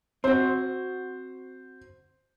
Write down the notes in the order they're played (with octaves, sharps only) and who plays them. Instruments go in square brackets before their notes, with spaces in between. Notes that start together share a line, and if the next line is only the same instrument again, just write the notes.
[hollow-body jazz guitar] C4 F#4 [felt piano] C5